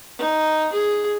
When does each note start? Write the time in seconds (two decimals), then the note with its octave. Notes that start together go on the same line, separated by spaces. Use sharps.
0.18 D#4
0.73 G#4